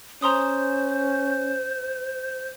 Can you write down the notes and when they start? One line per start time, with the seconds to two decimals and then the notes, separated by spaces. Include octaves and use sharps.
0.22 C#4 C5 A#5 C6 D#6